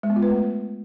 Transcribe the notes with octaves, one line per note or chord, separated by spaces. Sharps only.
G#3
B3
F4
B4
A3